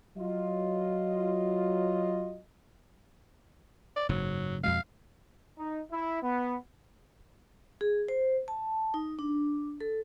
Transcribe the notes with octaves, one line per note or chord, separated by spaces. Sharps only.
F#3 F4 D#5
D5
F#1 G#2 F#3
F2 B2 G#3 F5
D#4
E4
B3
G#4
C5
A5
D#4
D4
A4